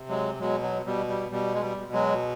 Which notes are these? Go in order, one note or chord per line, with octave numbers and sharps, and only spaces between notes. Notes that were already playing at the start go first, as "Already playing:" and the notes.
Already playing: C3
F#3 G#3
B2 F#3 G#3
F#3
B2 G3
G3
B2 G3
G#3
G3
B2
F#3 G#3